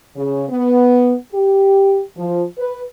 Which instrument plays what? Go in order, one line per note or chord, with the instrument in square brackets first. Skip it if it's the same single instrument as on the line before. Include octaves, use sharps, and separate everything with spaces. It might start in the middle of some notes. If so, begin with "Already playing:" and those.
[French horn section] C#3
B3
G4
F3
B4